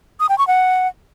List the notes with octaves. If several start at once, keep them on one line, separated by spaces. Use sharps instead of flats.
D#6
G5
C#6
F#5